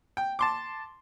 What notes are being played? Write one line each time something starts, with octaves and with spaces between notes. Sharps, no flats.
G5
A5 C6 D6